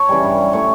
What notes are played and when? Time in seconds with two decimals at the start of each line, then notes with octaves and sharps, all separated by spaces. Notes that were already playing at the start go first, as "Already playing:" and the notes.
Already playing: C#5 A5
0.09 C#3 E3 G3
0.23 G2
0.38 F#3
0.53 A2 C#5